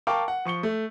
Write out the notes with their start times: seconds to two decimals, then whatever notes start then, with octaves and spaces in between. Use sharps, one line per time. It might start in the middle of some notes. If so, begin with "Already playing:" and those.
0.07 A#4 F5 G5 A5 C#6 D6
0.28 F#5
0.45 F3 C#6 C#7 G7
0.63 A3